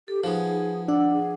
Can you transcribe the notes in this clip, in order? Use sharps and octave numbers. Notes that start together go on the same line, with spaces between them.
G4 A4
F3 B3 D#4 G#4
D4 F#5 D6 E6
G#4